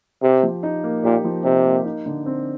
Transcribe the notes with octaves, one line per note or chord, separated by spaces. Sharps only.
C3 G4
F3
D#4
A#3
A#2 G4
F3
C3 D#4
A#3
D#4
D3
C4